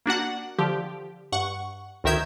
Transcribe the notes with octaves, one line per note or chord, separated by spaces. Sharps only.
A#3 D4 F#4 F#5
D3 F3 G4
G2 F#5 C#6
D2 D#3 A#4 E5 G6 G#6